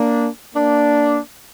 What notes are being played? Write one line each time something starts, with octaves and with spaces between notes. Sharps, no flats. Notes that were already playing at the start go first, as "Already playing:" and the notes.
Already playing: A#3 D4
A#3 D4